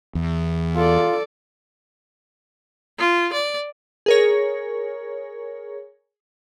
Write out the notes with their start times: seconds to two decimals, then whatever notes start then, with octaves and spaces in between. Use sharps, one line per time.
0.15 E2
0.76 F4 A4 D5
2.99 F4
3.33 D5
4.06 G#4 A#4 C#5